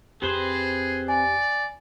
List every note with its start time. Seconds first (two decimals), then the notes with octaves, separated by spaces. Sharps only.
0.22 F2 C4 G4 G#4 B4 C5
1.08 D5 G#5